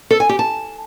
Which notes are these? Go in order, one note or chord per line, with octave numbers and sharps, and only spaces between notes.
A4
G#5
G4
A5